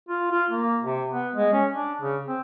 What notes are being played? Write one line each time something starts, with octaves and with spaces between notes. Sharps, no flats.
F4
F4
A#3
C3
B3
G#3
C#4
D4
C#3
C4